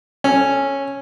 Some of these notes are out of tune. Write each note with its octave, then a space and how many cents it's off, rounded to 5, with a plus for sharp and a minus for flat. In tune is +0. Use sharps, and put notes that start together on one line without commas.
C#4 -5 A4 +0